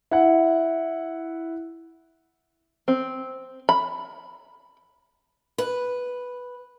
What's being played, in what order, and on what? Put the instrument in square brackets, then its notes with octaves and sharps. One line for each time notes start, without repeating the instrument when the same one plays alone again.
[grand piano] E4 F#5
[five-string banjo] C4
B5
[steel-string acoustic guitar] B4